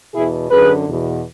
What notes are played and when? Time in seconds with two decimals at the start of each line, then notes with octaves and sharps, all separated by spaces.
0.14 E2 B2 E4 G#4
0.50 F#2 D3 G#4 B4
0.87 E2 B2